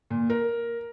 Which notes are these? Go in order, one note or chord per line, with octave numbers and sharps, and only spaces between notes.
A#2
A#4